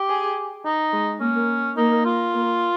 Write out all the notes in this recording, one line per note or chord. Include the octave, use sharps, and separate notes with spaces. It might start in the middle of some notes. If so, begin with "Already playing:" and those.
Already playing: G4
G#4
D#4
G#3
A#3 C#4
A#3 D#4
F4
A#3